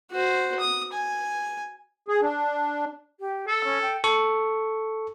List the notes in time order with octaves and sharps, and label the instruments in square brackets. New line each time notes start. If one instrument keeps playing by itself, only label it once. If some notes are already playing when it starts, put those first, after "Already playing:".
[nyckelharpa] F#4 C5
D#6
G#5
[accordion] G#4
D4
[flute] G4
[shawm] A4 [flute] E6
[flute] C#4
G5
[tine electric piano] A4 C#6